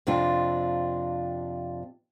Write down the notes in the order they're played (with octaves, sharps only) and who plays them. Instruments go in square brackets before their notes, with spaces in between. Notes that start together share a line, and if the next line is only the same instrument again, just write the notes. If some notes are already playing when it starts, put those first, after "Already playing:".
[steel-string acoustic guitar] F2 C3 D4 F4